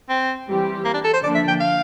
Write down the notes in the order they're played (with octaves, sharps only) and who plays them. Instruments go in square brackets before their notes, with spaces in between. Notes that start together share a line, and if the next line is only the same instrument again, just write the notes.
[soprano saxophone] C4
[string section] E3 G3 C4 G4
[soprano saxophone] A#3
D4
A4
C5
[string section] D3 F3 A#3 D4 [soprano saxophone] D5
[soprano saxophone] E5
G5
F5